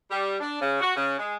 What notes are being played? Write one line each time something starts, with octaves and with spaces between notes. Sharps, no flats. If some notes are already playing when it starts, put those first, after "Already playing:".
G3
D4
C#3
F#4
C#3
G#3